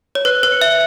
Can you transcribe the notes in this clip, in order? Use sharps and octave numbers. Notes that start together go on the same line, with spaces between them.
C#5
B4 F#6
B4
C#7 F#7
E5